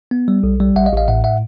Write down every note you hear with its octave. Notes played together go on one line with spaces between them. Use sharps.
B3
G3
B1
G3
A1 E5 F#5
D#5 F5
A1
D#5 F5
A2 E5 F#5
E5 F#5